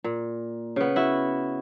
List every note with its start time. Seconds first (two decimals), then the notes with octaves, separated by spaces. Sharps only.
0.04 A#2
0.76 C#3 B3
0.96 E4 F#4